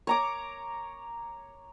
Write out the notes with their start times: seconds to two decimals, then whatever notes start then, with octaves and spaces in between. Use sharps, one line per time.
0.07 C#5 A#5 D6